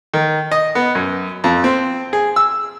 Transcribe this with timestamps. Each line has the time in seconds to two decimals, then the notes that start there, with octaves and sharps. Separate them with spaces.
0.14 D#3
0.51 D#5
0.75 B3
0.95 F#2
1.44 F2
1.64 C4
2.13 G#4
2.36 E6